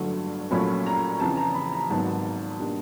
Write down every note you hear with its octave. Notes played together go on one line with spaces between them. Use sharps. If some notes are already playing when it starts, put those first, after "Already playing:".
Already playing: G1 G2 D3 F#3 A3
A#1 A#2 F#3 A3 C#4 B5
A#5
F2 C#3 E3 A5
A#5
B5
A#5
G#1 G#2 D#3 F#3 B3 A5
B2 G3 A#3 D4